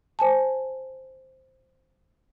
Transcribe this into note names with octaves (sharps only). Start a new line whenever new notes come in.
C5 G#5 A5